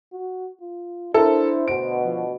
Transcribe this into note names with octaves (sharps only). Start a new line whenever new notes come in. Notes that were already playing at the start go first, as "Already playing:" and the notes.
F#4
F4
D4 E4 A4 A#4 C5
D2 B2 D7
F3